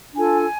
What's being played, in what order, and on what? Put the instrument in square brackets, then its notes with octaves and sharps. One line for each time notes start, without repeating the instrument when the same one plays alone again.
[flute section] D4 F4 A4 G#5